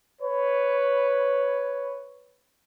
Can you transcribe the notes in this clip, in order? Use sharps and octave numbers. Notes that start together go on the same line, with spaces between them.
B4 C#5